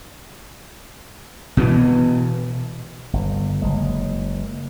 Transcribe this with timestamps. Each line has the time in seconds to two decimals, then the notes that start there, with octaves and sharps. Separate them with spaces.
1.57 B2 E3 B3
3.13 G1
3.62 F#1 G#3